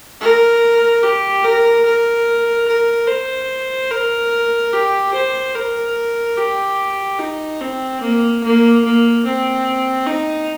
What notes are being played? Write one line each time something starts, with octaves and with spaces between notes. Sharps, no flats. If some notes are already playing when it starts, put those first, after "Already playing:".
A#4
G4
A#4
A#4
A#4
C5
A#4
G4
C5
A#4
G4
D#4
C4
A#3
A#3
A#3
C4
D#4